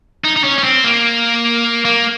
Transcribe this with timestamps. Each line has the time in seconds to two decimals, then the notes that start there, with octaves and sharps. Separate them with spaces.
0.24 D#4
0.36 D#4
0.44 C#4
0.58 C#4
0.64 C4
0.84 A#3
1.85 A#3